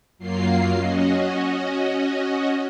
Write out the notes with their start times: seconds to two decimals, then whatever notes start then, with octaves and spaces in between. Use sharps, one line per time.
0.18 F#2 F#3 A#3 F4 C7
0.74 C#4 F#4 D#5